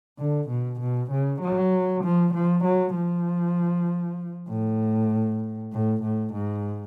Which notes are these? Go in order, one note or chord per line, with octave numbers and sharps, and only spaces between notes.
D3
B2
B2
C#3
F#3
F3
F3
F#3
F3
A2
A2
A2
G#2